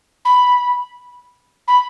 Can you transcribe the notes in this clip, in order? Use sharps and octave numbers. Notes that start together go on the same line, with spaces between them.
B5
B5